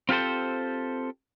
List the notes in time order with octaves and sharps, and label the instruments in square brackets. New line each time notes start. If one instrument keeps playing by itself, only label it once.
[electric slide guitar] C4 F4 G4 A4 C5